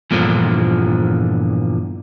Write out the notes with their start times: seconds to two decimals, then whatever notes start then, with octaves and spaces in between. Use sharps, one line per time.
0.11 E2 G2 A#2 D3 F3